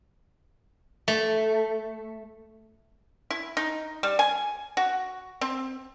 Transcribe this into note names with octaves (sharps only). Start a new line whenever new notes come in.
A3
E4
D#4
G3
G#5
F#4
C4